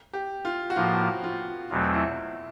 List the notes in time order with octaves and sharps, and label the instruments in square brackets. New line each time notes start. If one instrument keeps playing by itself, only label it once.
[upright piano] G4
F4
F#4
[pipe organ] A2 F3 A#3 [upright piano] F4
[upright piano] F4
[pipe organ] E2 B2 F#3 A3 C4 [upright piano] F4
[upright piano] E4